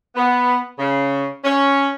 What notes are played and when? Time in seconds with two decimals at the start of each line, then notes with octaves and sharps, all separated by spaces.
0.16 B3
0.79 C#3
1.45 C#4